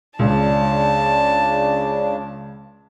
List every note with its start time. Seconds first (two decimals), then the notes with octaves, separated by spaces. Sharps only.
0.19 C#2 C#3 D4 A5